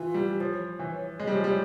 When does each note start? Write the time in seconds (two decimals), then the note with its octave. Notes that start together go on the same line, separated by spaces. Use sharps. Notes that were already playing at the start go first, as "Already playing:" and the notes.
Already playing: E3 F4
0.14 G3
0.40 F3 C#5
0.79 E3
1.20 G#3
1.27 G3
1.35 F3
1.44 G3